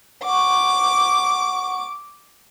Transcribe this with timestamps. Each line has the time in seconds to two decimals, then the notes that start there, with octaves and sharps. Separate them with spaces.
0.25 F#5 C#6 D6